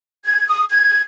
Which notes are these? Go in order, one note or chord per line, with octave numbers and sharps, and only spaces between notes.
G#6
D#6
G#6